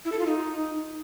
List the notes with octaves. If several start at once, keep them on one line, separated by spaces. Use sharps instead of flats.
E4
A4
F4
D#4